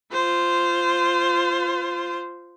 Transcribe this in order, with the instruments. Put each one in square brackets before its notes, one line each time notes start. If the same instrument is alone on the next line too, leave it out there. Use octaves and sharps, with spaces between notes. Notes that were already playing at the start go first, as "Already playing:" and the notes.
[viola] F4 C5